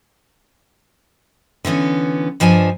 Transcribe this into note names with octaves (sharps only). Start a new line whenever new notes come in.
D3 E3 B3 C#4
G2 F3 D4 D#5 G#5